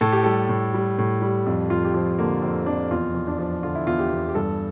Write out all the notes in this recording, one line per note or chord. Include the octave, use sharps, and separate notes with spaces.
A2 A4
G4
G3 A4
A2
G3
A2
G3
F2
F2 F4
G4
F3 F4
D3 A#3
F2 C4
F2 D4
E2 F4
E2
D4
F3
D3 F4
E4
E2 F4
G4
E2
G4
G2 A4